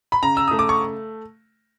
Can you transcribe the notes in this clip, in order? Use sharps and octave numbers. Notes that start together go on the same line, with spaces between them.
B5
C#3 A#5
E6
A3 D#6
D6
C#6